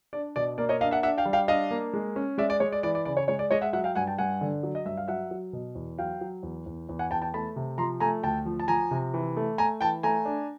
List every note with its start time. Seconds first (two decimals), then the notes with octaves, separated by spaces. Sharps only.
0.13 D4 D5
0.36 B2 D5
0.58 A#3 D5
0.69 C#5 D#5
0.81 D4 D#5 F5
0.91 E5 F#5
1.03 D4 E5 F#5
1.18 F5 G5
1.26 G3
1.33 F5 G5
1.48 D4 D#5 F5
1.71 A#3
1.94 G#3
2.16 C#4
2.38 G#3 D5 E5
2.50 D5
2.60 G#3 C#5
2.72 D5
2.83 E3 D5
2.95 D5
3.05 C#3 D5
3.17 C#5
3.28 G#3 C#5
3.39 D5
3.51 G#3 C#5 D#5
3.61 E5 F#5
3.73 F#3 E5 F#5
3.84 F5 G5
3.95 G2 F#5 G#5
4.07 G5 A5
4.18 G2 F#5 G#5
4.41 D3
4.63 F#3
4.75 D#5
4.85 G2 E5
4.97 F5
5.08 F#3 E5 F#5
5.31 F#3
5.53 B2
5.75 E2
5.98 F#3 F5 G5
6.21 F#3
6.43 E2
6.66 E2
6.89 E2
6.99 F#5 G#5
7.11 E2 G5 A5
7.22 G5 A5
7.33 A3 A5 B5
7.56 C3
7.78 F3 A#5 C6
8.00 A3 G#5 A#5
8.23 D2 G5 A5
8.46 F3
8.60 A5
8.68 F3 G#5 A#5
8.91 C3
9.14 E3
9.37 A3
9.58 A3 G#5 A#5
9.81 E3 G5 A5
10.03 A3 G#5 A#5
10.25 D4